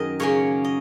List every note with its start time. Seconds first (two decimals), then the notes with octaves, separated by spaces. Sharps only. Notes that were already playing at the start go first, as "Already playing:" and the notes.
Already playing: F#2 D#3 G#4 A#4 D#5
0.20 C#3 A#3 C#4 C#5
0.64 D#5